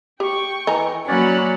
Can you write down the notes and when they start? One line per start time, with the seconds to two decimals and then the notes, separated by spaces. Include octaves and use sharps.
0.20 G4 G5 C#6
0.67 E3 D#5 G#5 A#5
1.08 F#3 A#3 C#4 C#5 D5 F#5 B5